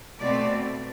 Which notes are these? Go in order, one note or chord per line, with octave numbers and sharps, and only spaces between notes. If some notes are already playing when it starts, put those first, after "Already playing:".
B2 A3 C4 D5